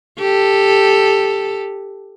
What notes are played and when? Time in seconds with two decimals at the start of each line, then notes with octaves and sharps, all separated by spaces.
0.19 G4 A4